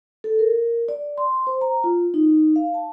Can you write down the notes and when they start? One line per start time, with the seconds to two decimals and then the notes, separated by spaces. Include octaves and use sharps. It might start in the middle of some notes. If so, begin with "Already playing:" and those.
0.24 A4
0.39 A#4
0.89 D5
1.18 C6
1.47 C5
1.61 A#5
1.84 F4
2.14 D#4
2.56 F5
2.74 A5